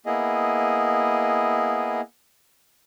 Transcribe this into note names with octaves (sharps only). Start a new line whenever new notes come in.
A#3 B3 E4 G#4 D#5